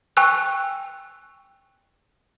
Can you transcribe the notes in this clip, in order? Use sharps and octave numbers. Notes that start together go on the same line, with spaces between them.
G5 G#5 C#6 E6 F#6